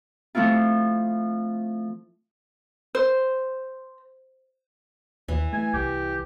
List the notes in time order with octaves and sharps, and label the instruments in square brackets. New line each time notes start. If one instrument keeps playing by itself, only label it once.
[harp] F3 A3 C4 E4 F4
[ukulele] C5
[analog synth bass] D#2 [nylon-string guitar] E3
[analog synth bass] A3 [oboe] G#5
[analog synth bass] C2 [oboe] G4